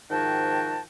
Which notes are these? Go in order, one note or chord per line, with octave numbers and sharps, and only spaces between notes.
G#2 D#3 F3 F#4 G5 A5